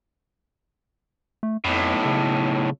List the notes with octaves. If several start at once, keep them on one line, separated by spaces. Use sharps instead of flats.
A3
B1 F2 A2
C#3